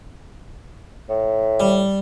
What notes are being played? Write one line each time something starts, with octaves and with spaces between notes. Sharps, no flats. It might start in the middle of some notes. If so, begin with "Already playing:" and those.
A2
G3